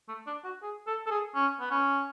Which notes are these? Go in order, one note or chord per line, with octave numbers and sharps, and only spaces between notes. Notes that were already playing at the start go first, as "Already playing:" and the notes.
A3
D4
F#4
G#4
A4
A4
G#4
C#4
B3
C#4